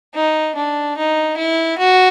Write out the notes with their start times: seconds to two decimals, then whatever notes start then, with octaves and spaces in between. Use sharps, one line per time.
0.15 D#4
0.56 D4
0.97 D#4
1.37 E4
1.78 F#4